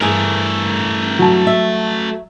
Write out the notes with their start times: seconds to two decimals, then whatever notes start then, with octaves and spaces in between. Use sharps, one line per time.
0.01 G2 E3 A3 G#4 A#4
1.19 F#3 A5
1.47 E5